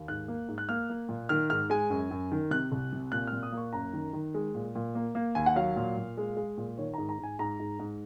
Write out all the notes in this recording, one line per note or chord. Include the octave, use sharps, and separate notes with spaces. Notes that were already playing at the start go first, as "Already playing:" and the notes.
Already playing: D#2
G#2 F#6
A#3
G#2
F#6
A#3 F6
A#3
A#2
D#3 F6
G#2 F6
G#3 G#5
F#2
F#2
D#3
C3 F#6
C2
C3
A#2 F#6
A#2 F6
D#6
A#3
C#6
F#2 A#5
D#3
D#3
G#3
A#2
A#2
A#3
A#3
D#2 G#5
F#5
F#3 F5
A#2
A#2
G#3
G#3
A#2
D#3 C#5
G#2 A#5
A#5
G#2
G#5
G#2 A#5
G#2
G#2